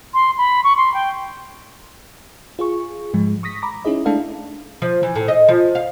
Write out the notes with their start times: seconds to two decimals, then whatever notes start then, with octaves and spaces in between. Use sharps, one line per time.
0.14 C6
0.38 B5
0.64 C#6
0.77 C6
0.94 G5
2.59 F4 G#4 C#6
3.14 G#2 F3 G#3
3.43 C#6 D#6 A#6 B6
3.62 A#5 B5 D6 A#6
3.85 C#4 D#4 E4 G#4 D#5
4.06 G#3 A3 D4 E4 A4 F5
4.82 F3
5.03 E3
5.15 A2
5.28 D#5
5.48 F3
5.75 F5